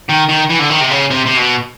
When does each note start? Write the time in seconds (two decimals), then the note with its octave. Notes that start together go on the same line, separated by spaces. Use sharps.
0.09 D#3
0.29 D#3
0.50 E3
0.60 D3
0.70 D#3
0.81 C3
0.91 C#3
1.11 C3
1.26 C3
1.37 B2